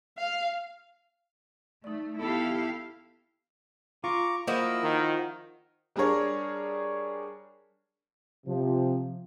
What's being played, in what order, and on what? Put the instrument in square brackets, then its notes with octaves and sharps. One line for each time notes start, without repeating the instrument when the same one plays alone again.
[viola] F5
[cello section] A3 [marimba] D#4 D5
[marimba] B3 [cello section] E4 G4 F5 [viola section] A4
[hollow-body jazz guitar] F4 [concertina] A#5 C#6 D6
[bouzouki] F3 E4 F#4 [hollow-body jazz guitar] A#3 [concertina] D#5 E6
[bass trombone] D#3
[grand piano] G3 D4 G#4 A#4 C#5
[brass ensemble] C3 F3